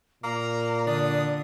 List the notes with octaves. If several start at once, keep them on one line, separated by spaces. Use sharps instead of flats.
A#2 A#3 A#5
D3 D4 D#6